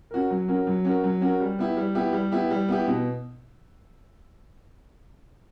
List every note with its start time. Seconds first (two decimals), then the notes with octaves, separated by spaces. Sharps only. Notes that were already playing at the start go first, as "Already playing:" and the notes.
0.11 C#4 F#4 A#4
0.30 F#3
0.48 C#4 F#4 A#4
0.67 F#3
0.85 C#4 F#4 A#4
1.04 F#3
1.21 C#4 F#4 A#4
1.40 G3
1.59 B3 E4 G4
1.77 G3
1.95 B3 E4 G4
2.13 G3
2.32 B3 E4 G4
2.51 G3
2.69 B3 E4 G4
2.87 B2